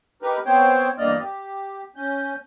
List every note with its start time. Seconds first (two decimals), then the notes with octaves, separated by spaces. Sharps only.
0.22 D#4 G4 A#4 B4
0.46 B3 C4 C5 C#5 G5
0.98 E2 G2 A#3 D5 D#5 F6
1.19 G4
1.96 C#4 G6